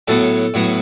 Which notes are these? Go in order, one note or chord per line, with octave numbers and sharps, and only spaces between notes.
A2 F#3 B3 A4
A2 F#3 B3